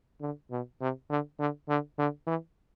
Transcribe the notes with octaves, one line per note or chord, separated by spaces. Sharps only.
D3
B2
C3
D3
D3
D3
D3
E3